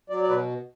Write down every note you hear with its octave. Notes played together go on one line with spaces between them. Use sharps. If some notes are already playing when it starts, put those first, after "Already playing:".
F#3 D5
D5
B2 B4